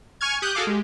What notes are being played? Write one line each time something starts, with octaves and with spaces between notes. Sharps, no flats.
G#5 C#6 F6 G#6
G4 D#6 F#6 G6
F#4 G#4 A4 F5 D6
G#3 G4